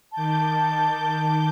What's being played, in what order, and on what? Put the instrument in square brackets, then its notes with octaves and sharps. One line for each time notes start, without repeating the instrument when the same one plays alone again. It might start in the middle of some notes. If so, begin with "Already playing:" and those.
[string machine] D#3 D6 G6 [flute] A5